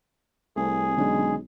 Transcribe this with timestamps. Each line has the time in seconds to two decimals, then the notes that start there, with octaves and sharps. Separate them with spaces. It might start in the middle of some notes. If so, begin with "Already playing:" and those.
0.56 C2 A3 C4 G#4
0.97 B1 D3 G#3 C#4 D4